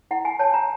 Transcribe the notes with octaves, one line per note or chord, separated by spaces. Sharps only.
E4 F#5
G#5
C#5 A5
A#5